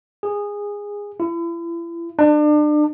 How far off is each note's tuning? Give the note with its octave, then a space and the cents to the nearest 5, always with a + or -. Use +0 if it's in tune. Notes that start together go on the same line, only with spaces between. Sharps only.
G#4 -15
E4 +40
D4 +35